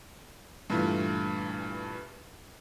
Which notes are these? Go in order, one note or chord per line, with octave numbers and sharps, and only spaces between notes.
G2 A#2 E3 A3 F4